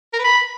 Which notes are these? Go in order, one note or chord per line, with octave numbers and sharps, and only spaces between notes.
A#4
B4
B5